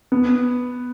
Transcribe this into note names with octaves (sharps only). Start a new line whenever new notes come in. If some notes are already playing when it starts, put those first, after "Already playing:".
B3